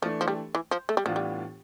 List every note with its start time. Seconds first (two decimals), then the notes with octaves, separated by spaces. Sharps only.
0.02 E3 F3 A3 D4
0.21 F3
0.28 G3
0.55 E3
0.71 F3
0.89 A3
0.97 G3
1.06 A2 E3 F3 B3 D4 F4
1.16 G3